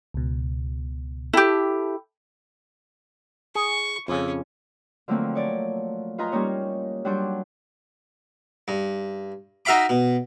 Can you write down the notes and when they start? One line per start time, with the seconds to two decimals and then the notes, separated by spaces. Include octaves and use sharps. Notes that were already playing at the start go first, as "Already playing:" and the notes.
0.14 C#2 B2
1.33 E4 G4 A4 G5
3.55 G#4 C#6
4.08 F2 C#3 C#4
5.08 D3 F3 F#3 A3 A#3 C4
5.35 C#5 D5
6.18 F4 B4 D#5 G#5 A#5 C6
6.32 G3 A#3 C#4 D#4 C#5
7.05 F#3 G3 D4 F#5 C6 G6
8.68 G2
9.65 D#4 F#4 E5 F5 B5 D6
9.89 B2